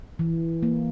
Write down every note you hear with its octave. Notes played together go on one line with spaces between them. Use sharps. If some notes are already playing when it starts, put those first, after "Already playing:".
E3
A#3